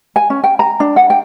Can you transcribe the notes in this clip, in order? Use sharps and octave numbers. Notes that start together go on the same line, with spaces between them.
G#5
C#4
G5
A#5
D4
F#5
G5